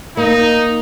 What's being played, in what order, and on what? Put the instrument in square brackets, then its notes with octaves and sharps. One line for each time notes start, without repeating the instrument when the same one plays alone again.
[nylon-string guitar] A#3 [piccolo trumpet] D#4